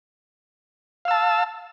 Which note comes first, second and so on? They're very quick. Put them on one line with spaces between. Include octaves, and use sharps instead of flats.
F5 E6 A5